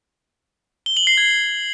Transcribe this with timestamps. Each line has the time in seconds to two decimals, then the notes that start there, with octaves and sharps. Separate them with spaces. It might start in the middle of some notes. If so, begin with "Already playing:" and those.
0.86 G7
0.97 F#7
1.07 C7
1.17 G#6